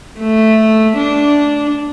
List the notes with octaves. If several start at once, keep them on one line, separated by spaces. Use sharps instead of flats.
A3
D4